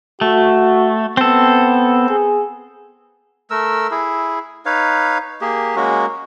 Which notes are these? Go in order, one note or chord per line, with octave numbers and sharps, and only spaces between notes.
A3 F#4
B3 C4 A4
G#4
A3 A#4 E6
E4 G#4
D#4 B4 C#5 F5
A#3 G4 G#4
G#3 A#3 C#4 F#4